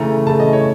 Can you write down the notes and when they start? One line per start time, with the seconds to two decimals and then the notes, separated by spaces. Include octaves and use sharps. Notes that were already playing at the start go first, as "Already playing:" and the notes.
Already playing: C#3 E3 A3 A#5
0.27 C#3 E3 A3 A5
0.40 D#5
0.53 C#5